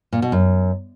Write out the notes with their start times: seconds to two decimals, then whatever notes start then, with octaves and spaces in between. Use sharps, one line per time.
0.13 A#2
0.22 B2
0.32 F#2